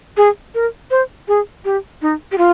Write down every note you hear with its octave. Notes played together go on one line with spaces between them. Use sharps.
G#4
A#4
C5
G#4
G4
D#4
G4
F4